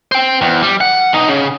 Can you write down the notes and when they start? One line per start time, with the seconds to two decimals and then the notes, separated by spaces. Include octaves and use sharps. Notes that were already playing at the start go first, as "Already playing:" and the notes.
0.12 C5 G5
0.41 E2
0.63 G3
0.81 F#5
1.13 E2 D#4
1.28 C#3